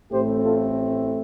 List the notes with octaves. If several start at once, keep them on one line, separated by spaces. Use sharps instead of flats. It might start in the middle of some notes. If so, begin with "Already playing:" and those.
A1 A2 A3 C4 G4 C5
F4 A4